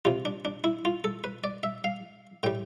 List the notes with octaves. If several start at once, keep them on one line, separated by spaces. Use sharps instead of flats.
C3 G3 F4
D4
D4
E4
F4
A4
B4
D5
E5
F5
A2 G3 G5